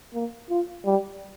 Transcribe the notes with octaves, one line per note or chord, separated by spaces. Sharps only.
A#3
F4
G3